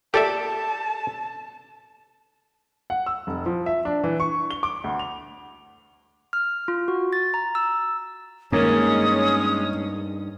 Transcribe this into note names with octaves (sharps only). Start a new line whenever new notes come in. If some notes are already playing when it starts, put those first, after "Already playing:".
G4 A4 D5 E5 A5
F#5
E6
F1
F3
E5
D4
E3
C#6
G7
D6
D2
F7
F6
F4
F#4
A6
A#5
E6
G2 D#3 G#3 A#3 C#4 D#6